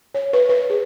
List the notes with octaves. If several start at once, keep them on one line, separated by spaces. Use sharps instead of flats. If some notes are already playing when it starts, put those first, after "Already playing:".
C#5
B4
B4
G#4